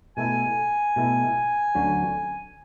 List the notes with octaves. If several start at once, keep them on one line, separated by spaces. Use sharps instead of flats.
B2 A3 E4 A4 G#5
B2 A3 E4 A4
D2 D3 F#3 C#4